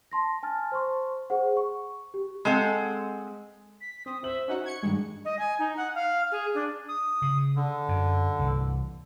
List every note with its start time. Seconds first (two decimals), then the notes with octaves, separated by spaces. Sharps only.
0.12 A5 C6 A#6
0.43 G#5 A5 F6 A6
0.72 C5 C6 C#6
1.30 G#4 C5 F#5
1.57 C#6
2.14 G4
2.45 G#3 C4 A4 F#5
3.81 B6
4.06 C4 D#6
4.23 C5 E5 F#7
4.48 C#4 D#4 F#4 F#5
4.66 C#6 G#6 C#7
4.83 G2 D#3 G#3
5.25 D#5
5.39 G#5
5.59 D#4
5.77 F#5
5.95 F5
6.32 G#4
6.54 D4
6.89 D#6
7.22 C#3
7.56 D3
7.89 F#2
8.39 C2 E3